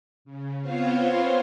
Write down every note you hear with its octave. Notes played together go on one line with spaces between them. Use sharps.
C#3
B3 C4 F4 C5 C#5 F5